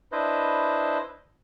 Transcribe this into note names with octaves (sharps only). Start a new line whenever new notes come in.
D4 E4 B4 C5 D#5